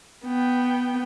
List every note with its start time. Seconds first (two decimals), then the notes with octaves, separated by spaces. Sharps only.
0.25 B3 G5